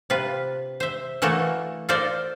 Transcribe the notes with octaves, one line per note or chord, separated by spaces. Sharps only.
C3 F4 B4
C5 E5
E3 A3 A#3 F#4 A4
F4 A4 A#4 C5 D5